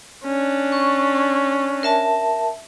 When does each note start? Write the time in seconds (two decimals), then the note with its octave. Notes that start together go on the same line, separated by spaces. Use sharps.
0.25 C#4 D4
0.72 C#6
1.83 A#4 E5 A5